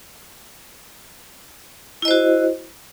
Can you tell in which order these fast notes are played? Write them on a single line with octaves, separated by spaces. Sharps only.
E4 D#5 C5 F#4